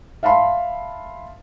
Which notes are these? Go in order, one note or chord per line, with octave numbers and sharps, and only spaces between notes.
E5 F5 A5 B5 C6